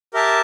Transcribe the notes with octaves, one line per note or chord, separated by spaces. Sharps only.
G4 A#4 E5 A5